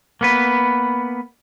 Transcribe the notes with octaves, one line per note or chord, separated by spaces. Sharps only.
A#3 B3 B4